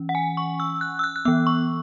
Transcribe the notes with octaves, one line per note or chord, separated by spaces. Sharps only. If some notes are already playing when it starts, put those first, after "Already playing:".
Already playing: E3 C#4
F#5
G#5
C#6
E6
F#6
E6
F#6
F#6
E3 B3 E6
C#6